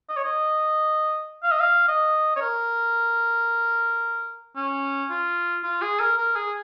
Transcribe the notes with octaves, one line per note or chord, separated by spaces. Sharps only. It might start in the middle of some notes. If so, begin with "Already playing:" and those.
D#5
C#5
D#5
F5
D#5
F5
D#5
C#5
A#4
C#4
F4
F4
G#4
A#4
A#4
G#4